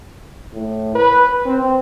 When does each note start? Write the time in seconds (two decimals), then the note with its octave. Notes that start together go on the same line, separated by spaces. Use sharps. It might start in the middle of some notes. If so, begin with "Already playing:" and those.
0.53 A2
0.95 B4
1.46 C4